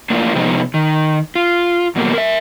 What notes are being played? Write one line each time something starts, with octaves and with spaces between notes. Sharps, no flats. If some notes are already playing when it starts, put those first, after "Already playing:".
A2 A#3 D4 F4
C3 F3 G#3 B3 D#4
D#3
F4
F#2 B2 G3 A#3
A#4 E5